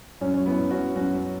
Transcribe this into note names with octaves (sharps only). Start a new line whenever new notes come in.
F#2 C#4
C#4
F#3
B3 E4
F#2
C#4 F#4
F#3
F#2 C#4 F#4
F#3